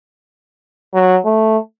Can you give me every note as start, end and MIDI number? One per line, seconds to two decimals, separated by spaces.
0.94 1.17 54
1.25 1.58 57